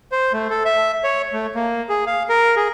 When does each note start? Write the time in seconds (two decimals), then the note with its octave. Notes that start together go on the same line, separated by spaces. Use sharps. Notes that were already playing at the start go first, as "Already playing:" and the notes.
0.12 C5
0.33 A3
0.50 A4
0.65 E5
1.04 C#5
1.33 A3
1.55 A#3
1.89 G#4
2.06 F5
2.29 A#4
2.56 G#4